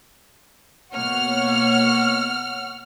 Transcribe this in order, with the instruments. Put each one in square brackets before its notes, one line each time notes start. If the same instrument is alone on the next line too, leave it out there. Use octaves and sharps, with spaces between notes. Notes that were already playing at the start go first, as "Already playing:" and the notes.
[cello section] B2 A#3 C#5 [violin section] F#5 F6